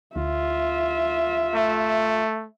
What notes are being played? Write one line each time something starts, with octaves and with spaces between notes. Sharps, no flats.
D2 F4 E5
A3